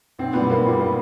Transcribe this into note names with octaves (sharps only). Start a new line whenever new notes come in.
B1 C4
A#2 G3 B3
B1 A#3
A#2 G3
A#3